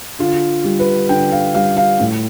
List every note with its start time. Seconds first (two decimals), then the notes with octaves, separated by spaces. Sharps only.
0.19 D3 F4
0.64 G3
0.79 B4
1.09 D3 G5
1.32 F5
1.54 G3 F5
1.77 F5
2.00 A2